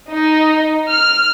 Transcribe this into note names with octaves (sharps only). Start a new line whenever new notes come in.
D#4
F6